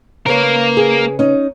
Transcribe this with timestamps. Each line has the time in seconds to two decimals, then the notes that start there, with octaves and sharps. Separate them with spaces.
0.26 C#3 A#3 A#4 B4 C#5
0.77 G#4
1.19 C#4 D#4